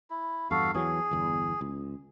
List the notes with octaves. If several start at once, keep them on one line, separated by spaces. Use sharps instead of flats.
E4
E2 G2 F#4 A4 F5
E2 E3 F#3 G#4
G1 E2
C#2